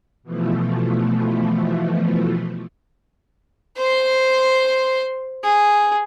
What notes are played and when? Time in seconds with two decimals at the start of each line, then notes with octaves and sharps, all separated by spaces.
0.23 B2 E3 F3 A3
3.78 C5 C6
5.44 G#4